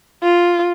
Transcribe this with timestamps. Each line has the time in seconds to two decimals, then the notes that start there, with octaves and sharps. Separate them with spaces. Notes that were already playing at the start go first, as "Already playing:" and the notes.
0.23 F4